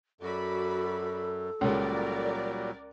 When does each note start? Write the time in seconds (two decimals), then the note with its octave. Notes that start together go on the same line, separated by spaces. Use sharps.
0.21 F#2 F#4 A4 D5 B5
1.61 C#2 A#2 C#3 F#3 G3 A#4 D5